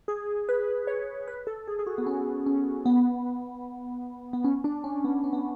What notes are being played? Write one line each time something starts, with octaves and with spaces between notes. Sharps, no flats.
G#4
B4
C#5
B4
A4
G#4
G#4
F#4
B3
C#4
C#4
B3
B3
C#4
D4
C#4
B3
C#4
B3